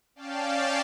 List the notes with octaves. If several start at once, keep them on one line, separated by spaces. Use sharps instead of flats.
C#4 D5 F5 G5 A5